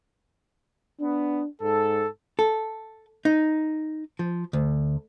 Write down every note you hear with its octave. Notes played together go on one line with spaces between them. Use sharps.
B3 D4
G#2 A4
A4
D#4
F3
D2